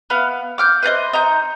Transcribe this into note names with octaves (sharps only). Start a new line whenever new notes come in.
B3 F5
D6 F6 G6
B4 C5 D5 D#5
D#4 A#5 G6